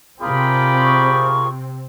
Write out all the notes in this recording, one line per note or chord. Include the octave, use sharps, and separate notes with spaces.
C3 C4 F4 G#4 A#4 D5 G5 B5
C#6